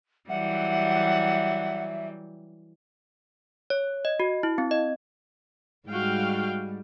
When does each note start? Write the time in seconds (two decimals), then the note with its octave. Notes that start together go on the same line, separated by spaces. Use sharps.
0.29 E3 F#3 G3 E5 F#5
3.70 C#5
4.05 D#5
4.20 F#4
4.43 E4
4.58 C4
4.71 D#5
5.89 G#2 G3 F#4 F5 G5